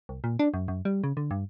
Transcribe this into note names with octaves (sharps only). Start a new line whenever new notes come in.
C2
A#2
D4
F#2
F#2
G3
C#3
D3
G2